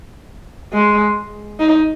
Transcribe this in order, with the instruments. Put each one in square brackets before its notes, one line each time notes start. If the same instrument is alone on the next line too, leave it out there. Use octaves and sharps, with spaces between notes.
[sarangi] G#3
D#4